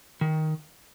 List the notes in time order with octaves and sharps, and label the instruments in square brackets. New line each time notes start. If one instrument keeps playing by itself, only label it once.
[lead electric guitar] D#3